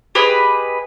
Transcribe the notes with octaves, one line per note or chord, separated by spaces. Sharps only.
G4 G#4 B4 D#5